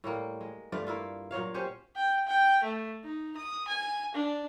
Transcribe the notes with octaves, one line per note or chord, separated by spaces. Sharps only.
A2 G3 A#3
G#3
G2 A3 F4 D5
A#3 E4 F4
A#2 F#3 C#5 F5
C#4 G4 C5 C#5
G5
G5
A3
D#4
D#6
G#5
D4